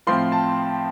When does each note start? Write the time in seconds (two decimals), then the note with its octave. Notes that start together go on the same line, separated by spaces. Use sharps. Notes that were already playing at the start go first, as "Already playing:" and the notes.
0.07 A2 F3 C4 F4 C6
0.32 A5